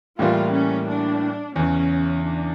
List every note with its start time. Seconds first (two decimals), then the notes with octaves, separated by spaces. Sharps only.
0.19 A2 E3 G3 A#3 F4
0.53 C#4
0.88 D4
1.56 E2 C#3 E3 C#4
2.24 D4